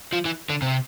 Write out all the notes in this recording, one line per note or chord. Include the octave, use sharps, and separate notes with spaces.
F3
E3
D3
C3